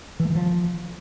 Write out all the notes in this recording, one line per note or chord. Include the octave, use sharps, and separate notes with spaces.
E3
A3
E3
F3